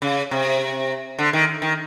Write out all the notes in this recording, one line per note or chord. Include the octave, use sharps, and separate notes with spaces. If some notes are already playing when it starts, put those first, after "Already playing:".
C#3
C3
D3
D#3
D#3